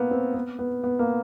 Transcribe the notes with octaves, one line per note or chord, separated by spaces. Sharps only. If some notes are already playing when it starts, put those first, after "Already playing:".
Already playing: A#3 B3
C4
B3
B3
B3
A#3